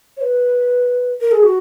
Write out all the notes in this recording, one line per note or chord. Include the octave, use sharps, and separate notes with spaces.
C#5
B4
A#4
G#4
F#4